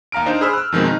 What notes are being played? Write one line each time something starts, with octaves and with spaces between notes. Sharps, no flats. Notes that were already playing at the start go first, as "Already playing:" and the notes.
D#2 F5 A#5 F6 D7
D4 D#4 C5
G#4 C5 B5 E6 F6
E6 F#6
F2 B2 D#3 F3 G#3 C4
D#4